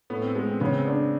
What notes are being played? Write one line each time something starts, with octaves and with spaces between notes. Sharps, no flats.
A2 B3
C4
G#3 B3
C4
C#3 B3
C4
B3 D4